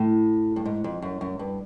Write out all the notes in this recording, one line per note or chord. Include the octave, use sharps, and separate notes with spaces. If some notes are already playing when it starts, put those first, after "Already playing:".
Already playing: A2
G2
G#2
F2
F#2
F#2
G2